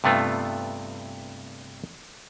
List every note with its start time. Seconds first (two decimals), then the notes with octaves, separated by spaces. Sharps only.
0.04 G2 C3 A3 B3 F4